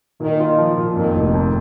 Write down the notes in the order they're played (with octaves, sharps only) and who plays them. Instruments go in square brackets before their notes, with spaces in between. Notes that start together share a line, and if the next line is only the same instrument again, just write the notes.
[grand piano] A#2 [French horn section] D#3
[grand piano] F4
F3
A#2
[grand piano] F2 [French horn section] D#3
[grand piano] F1
F2